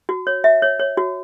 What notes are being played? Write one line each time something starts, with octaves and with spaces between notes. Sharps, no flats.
F#4
C#5
E5
C#5
C#5
F#4